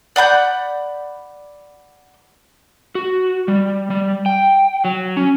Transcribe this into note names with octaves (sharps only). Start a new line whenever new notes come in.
D5 F#5 B5 G6
F#4
G3
G3
G5
F#3
C#4